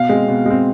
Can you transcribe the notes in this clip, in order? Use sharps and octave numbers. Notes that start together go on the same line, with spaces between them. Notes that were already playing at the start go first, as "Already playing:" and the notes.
Already playing: B2 F5
G#3 C4
B2
G#3 C4